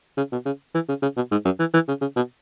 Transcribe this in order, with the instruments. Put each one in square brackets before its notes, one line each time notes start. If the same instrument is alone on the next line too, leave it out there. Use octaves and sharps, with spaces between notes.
[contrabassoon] C#3
B2
C#3
E3
C#3
C#3
B2
G#2
F#2
E3
E3
C#3
C#3
B2